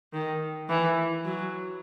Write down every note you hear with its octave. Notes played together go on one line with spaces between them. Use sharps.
D#3
E3
F#3